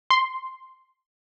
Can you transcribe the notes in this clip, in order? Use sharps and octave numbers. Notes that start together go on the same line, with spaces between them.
C6